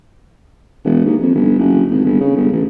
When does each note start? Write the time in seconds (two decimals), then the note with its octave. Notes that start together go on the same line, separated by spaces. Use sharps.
0.85 E1
1.05 D#2
1.21 F2
1.35 G1
1.59 F#1
1.90 G#1
2.05 G1
2.20 C#3
2.36 G1
2.52 A1